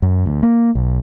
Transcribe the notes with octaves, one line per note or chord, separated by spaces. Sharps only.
F#2
D2
A#3
B1